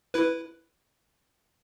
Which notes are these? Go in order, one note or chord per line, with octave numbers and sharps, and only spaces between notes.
E4 B4